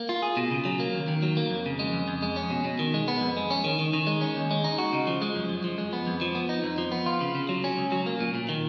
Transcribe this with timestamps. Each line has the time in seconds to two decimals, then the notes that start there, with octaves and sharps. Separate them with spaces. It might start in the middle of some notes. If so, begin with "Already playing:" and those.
Already playing: A#3
0.09 F4
0.22 G#4
0.37 B2
0.51 C#3
0.65 F#3
0.80 A#3
0.94 D#2
1.08 D#3
1.23 F#3
1.37 A#3
1.51 F2
1.66 C#3
1.79 G#3
1.93 F2
2.08 F2
2.22 G#3
2.36 C#4
2.50 B2
2.64 B2
2.79 D#3
2.94 G#3
3.08 B3
3.21 F2
3.37 G#3
3.50 C#4
3.64 D#3
3.79 D#3
3.93 D#3
4.07 G#3
4.21 C#4
4.36 D#2
4.51 G#3
4.64 D#4
4.78 F#4
4.93 C#3
5.07 F3
5.22 G#3
5.36 F#2
5.49 F#2
5.64 F3
5.78 G#3
5.93 B3
6.07 F2
6.21 F3
6.35 B3
6.49 D#4
6.64 F2
6.78 F3
6.92 B3
7.06 F4
7.21 C#3
7.35 C#3
7.49 F#3
7.64 C#4
7.78 C#2
7.92 F#3
8.06 A#3
8.20 A#2
8.35 A#2
8.49 D#3